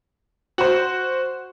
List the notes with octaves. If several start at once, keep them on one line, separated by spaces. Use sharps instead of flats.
F#4 C5